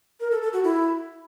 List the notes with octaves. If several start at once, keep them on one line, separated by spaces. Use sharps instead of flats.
A#4
A4
A4
F#4
E4